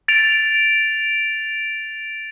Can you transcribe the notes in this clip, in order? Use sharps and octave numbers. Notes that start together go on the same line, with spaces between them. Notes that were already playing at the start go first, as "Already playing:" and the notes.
A6 D7 F7